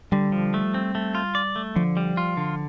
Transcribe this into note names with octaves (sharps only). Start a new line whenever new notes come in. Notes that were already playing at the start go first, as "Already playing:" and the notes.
D3 G3
F3
A3
C4
A3
F4
D5
A3
D3 F3
G3
F4
D3